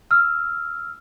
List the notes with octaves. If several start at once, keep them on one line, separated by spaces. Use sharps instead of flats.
E6 F6